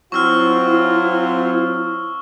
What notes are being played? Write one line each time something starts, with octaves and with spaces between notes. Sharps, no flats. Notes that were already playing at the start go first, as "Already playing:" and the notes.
F#3 C4 E4 F4 C#6 E6 F6